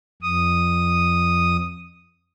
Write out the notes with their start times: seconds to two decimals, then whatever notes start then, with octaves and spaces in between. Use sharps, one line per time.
0.22 F2 D#6